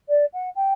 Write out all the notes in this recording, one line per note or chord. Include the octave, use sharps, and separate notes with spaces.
D5
F#5
G5